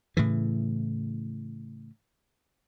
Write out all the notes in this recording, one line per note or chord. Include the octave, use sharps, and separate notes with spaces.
A2 C#3 E3